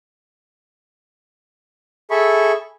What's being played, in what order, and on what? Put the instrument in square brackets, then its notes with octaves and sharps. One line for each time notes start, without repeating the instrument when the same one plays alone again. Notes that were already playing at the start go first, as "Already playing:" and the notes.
[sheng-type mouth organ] G#4 A4 E5 B5 C#6